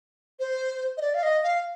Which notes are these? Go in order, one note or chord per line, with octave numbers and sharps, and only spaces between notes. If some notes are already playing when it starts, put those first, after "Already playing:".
C5
D#5
D5
F5
D#5
F5